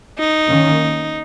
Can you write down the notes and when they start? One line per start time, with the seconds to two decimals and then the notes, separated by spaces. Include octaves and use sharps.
0.19 D#4
0.48 D#3 A#3 C#4